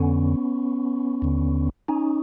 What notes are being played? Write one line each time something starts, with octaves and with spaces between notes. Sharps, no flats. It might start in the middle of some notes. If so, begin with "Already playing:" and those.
Already playing: F2 D3 B3 C#4
D#2 D3
C#4 D#4